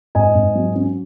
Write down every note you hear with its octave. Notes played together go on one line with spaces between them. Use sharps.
G#2 D#5 G#5
G#2
F#3
C#4